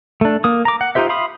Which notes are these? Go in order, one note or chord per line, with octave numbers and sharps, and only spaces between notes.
A3 D4
A#3 D#6
A#5 D6
F#5
D#4 F4 G4 C5 E5
E5 F5 B5 C6 D#6